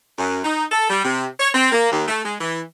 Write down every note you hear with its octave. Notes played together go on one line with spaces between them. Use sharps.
F#2
D#4
A4
G3
C3
C#5
C4
A#3
D#2
A3
G#3
E3